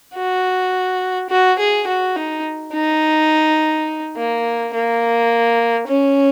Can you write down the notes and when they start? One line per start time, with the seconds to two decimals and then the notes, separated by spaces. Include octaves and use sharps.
0.15 F#4
1.30 F#4
1.59 G#4
1.87 F#4
2.16 D#4
2.73 D#4
4.17 A#3
4.74 A#3
5.88 C#4